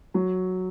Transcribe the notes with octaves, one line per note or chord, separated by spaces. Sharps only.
F#3